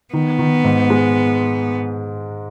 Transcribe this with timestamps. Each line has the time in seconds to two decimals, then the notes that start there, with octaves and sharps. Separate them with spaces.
0.13 D#3 B3
0.39 D#3
0.64 G#2
0.90 G#3